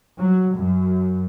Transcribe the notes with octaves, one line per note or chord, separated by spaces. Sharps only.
F#3
F#2